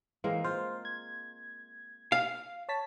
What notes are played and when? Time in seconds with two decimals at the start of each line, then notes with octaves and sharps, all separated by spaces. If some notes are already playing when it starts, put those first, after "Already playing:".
0.24 E3 G#3 A#3 C4 F5
0.44 F4 C5
0.85 G#6
2.12 F5
2.69 C#5 A5 B6